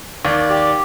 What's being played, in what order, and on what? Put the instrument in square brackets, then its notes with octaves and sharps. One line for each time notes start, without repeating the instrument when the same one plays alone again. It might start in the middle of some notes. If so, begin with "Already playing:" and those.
[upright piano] D#2 D#3 [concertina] D5
[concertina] G4